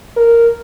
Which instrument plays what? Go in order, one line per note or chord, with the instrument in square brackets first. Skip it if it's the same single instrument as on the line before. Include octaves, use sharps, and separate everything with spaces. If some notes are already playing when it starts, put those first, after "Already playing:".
[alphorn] A#4